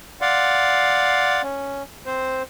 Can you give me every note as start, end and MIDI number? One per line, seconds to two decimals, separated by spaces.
0.21 1.42 74
0.21 1.42 77
0.21 1.42 78
0.21 1.42 84
1.43 1.83 61
2.06 2.43 60
2.06 2.43 72